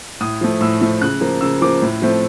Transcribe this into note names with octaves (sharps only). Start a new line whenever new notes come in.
A2 D#6
F3 A3
A2 E6
F3 A3
C#3 F#6
F3 A#3
C#3 E6
F3 A#3 D6
A2
F3 A3 C4